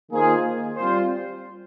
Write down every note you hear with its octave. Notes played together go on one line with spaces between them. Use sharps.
D#3 A#3 F4 G#4 C5
G3 C4 F4 C5